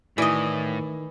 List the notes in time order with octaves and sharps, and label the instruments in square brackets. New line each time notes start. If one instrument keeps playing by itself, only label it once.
[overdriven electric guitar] A2 [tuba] D#3 [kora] E3 [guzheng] D5 D#5